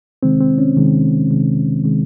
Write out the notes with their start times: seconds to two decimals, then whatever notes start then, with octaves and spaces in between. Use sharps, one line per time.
0.23 C3 D#3 G#3 C4
0.40 C4
0.58 C#4
0.76 C3 D#3 G#3
1.30 C3 D#3 G#3
1.84 C3 D#3 G#3